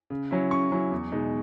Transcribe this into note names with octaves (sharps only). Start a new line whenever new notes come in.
C#3
F#3 C#4 E4
C#3 C#6
F#3 C#4 E4
E2
B2 G#3 D#4